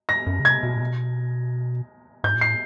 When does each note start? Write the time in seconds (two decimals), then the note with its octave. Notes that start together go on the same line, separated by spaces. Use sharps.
0.09 A#6
0.26 F#2
0.40 C#3
0.44 C3 G#6
0.63 B2
0.76 A#2
0.81 B2
2.24 G#2 G6
2.34 A#2
2.41 A2 C7